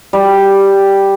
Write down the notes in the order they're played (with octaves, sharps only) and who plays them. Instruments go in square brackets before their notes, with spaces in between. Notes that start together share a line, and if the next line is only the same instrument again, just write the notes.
[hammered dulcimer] G3